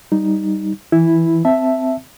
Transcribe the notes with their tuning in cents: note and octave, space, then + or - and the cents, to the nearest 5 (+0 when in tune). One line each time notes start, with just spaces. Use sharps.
G3 -5 D#4 +0
E3 +0 E4 +0
C4 -15 E5 +0 A5 +0